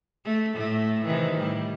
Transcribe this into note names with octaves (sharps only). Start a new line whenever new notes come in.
A3
A2 A3
C3 D#3 E3
A2 G3